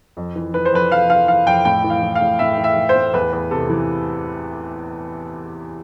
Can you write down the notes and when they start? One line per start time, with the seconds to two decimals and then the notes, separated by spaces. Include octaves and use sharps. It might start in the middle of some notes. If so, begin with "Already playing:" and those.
0.17 F2
0.36 E3
0.54 E3 B4
0.65 C5
0.72 F2 B4
0.91 F2 F5
1.10 E3 F5
1.28 E3 F5
1.46 F2 G5
1.65 A2 G5
1.84 E3
1.90 F5
2.03 E3
2.15 A2 F5
2.39 A2 E5
2.58 E3
2.64 E5
2.76 E3
2.89 C5
2.95 A2
3.13 E2 B4
3.33 E2
3.51 C3 A4
3.70 E3